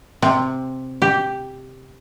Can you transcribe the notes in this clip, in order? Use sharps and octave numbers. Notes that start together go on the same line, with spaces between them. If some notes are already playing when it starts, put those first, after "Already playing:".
C3
G4